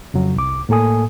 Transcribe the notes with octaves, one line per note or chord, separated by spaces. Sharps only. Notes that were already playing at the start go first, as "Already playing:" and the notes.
F2 C#3 F#3
C2 D6
A2 A#3 A4 G#5 D#6